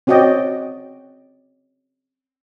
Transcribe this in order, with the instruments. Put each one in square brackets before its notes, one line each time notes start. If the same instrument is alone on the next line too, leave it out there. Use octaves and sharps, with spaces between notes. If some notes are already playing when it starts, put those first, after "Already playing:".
[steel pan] C4 C#4 F#4 D5 D#5 G5